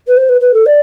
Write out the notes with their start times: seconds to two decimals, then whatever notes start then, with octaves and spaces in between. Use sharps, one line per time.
0.07 B4
0.16 C5
0.28 B4
0.40 B4
0.53 A4
0.66 D5